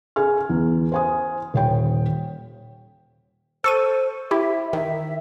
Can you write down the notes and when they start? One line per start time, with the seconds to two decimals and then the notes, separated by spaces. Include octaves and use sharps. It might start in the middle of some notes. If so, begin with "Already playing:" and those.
0.16 G#4 G#5 F6
0.49 E2
0.92 C5 G#5 D#6
1.54 D#1 C#5 G5
3.64 A4 C5 C#6 D#7
4.31 E4 G4 E5
4.73 D#3 E5